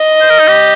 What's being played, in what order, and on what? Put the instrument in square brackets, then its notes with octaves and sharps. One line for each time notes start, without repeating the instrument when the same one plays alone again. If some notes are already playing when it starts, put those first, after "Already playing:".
Already playing: [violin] D#5
[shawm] C5
A#4
D#4
G4